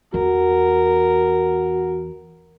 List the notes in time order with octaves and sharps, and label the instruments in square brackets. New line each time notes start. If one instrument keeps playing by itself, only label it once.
[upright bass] E2 [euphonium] F#4 [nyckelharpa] A#4